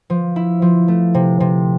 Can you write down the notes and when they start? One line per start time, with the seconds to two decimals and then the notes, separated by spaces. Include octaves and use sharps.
0.10 F3
0.36 E4
0.62 F3
0.88 A3
1.14 C3
1.40 C3